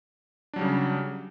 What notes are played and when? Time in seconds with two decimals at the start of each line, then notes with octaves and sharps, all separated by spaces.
0.53 D4
0.56 F#3
0.59 G3
0.61 C#3